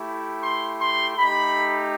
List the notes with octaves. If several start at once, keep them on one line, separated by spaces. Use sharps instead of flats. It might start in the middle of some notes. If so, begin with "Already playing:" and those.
Already playing: A3 E4 G4
C6
C6
A3 D#4 G4 B5